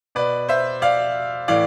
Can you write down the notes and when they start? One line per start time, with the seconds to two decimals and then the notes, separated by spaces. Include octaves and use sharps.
0.15 B2 B4 D5
0.49 C5 E5
0.82 D5 F5
1.48 A2 E3 D5 F5